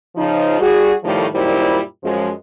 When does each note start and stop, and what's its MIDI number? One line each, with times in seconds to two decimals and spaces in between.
0.16 0.57 49
0.16 0.57 53
0.16 0.57 63
0.60 0.93 55
0.60 0.93 66
0.60 0.93 68
1.03 1.26 45
1.03 1.26 51
1.03 1.26 53
1.03 1.26 55
1.03 1.26 57
1.33 1.79 42
1.33 1.79 46
1.33 1.79 51
1.33 1.79 55
1.33 1.79 64
1.33 1.79 72
2.03 2.30 42
2.03 2.30 53
2.03 2.30 56